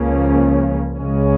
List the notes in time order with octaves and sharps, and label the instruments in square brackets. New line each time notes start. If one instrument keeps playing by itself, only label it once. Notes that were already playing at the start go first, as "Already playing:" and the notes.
Already playing: [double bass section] C#2 C#3 F3 A#3 C#4
C#2 C#3 G#3 C#4